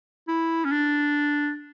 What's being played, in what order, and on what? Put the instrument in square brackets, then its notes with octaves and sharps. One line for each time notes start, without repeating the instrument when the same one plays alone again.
[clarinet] E4
C#4
D4